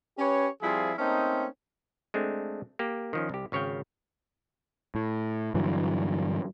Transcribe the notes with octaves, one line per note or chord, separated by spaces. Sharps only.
C#4 G4 B4 C#5
F3 G3 C4 E4 F4 G#4
A3 A#3 C4 C#4 D#4
G#3 A3 C4 D4
A#3 G4
D#3 F3 C#4
C2 G4
G#1 C#3 C#5 F5 G5
A2
G2 D3 E3 F#3